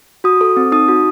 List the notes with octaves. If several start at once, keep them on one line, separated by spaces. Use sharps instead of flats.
F#4 D#6
A4
C4
D#4 D#6
F#4